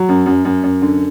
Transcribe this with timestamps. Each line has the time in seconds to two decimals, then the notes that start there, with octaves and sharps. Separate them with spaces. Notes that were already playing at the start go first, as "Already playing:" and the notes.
Already playing: F#3
0.09 F#2
0.26 F#2
0.45 F#2
0.63 F#2
0.82 D3